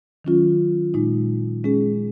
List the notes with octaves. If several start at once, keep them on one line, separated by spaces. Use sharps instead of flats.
D#3 F#3 C#4 F4
A#2 G#3 D#4
G#3 C#4 G#4